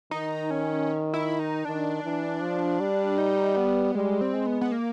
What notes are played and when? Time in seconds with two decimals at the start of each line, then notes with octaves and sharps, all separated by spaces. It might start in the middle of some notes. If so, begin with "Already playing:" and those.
0.11 D#3 D#4
0.51 C#4
1.14 E4
1.39 D#4
1.65 D#3 D4
2.03 E3
2.42 F3
2.80 G3
3.18 D#4
3.56 B3
3.95 G3 G#3
4.21 C4
4.34 G#3
4.46 B3
4.61 B3
4.72 A#3